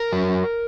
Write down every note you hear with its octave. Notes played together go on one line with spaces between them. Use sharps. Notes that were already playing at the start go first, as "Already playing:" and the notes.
Already playing: A#4
F#3